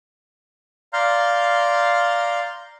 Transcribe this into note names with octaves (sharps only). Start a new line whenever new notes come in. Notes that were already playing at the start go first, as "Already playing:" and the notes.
D5 F5 A#5 C6 F6 G6